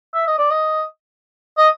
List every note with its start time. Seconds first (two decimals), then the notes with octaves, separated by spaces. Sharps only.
0.14 E5
0.27 D#5
0.39 D5
0.51 D#5
1.58 D#5